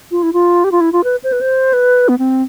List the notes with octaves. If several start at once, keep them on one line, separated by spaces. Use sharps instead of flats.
F4
E4
F4
G4
F4
E4
F4
B4
C5
B4
C5
B4
B3
C4